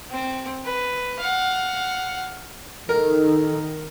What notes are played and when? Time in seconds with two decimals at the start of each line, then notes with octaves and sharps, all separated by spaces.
0.10 C4
0.65 B4
1.19 F5 F#5
2.89 D#3 A4 A#4